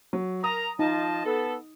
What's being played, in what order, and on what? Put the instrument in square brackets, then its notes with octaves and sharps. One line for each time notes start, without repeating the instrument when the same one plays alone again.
[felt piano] F#3
[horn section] A#4 A#5 [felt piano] D#6
[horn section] F3 D#5 A5 [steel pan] D#4
[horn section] B3 A4